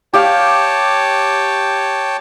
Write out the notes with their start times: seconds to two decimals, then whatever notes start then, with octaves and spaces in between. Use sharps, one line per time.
0.14 G4 C#5 F5 G5 A5